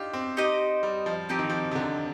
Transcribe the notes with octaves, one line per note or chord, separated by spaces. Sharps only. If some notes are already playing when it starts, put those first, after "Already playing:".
Already playing: D4 D#4 F4 G4
C4
D#4 G4 C5 D#5
G3
F3
F3 C4 D#4 G4
D#3
F3
C3
D3